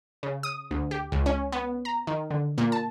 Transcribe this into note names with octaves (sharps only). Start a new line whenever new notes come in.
C#3
D#6
D2
G4
C#2
C#4
B3
A#5
D#3
D3
A#2
A5